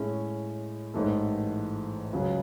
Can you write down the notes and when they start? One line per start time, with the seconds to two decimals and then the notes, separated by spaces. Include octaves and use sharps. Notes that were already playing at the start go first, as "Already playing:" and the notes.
Already playing: A2 G#3 C#4
0.94 A1 G#2 E3 A3
2.13 C#2 C#3 F#3 C#4